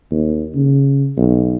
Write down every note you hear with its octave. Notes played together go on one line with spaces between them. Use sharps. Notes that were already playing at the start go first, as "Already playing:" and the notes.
D#2
C#3
B1